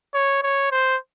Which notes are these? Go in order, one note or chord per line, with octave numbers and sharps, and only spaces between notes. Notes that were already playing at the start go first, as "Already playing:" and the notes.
C#5
C#5
C5